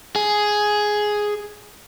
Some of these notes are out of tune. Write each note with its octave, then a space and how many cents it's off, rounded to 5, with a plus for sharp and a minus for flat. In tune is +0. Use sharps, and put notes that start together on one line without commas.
G#4 +5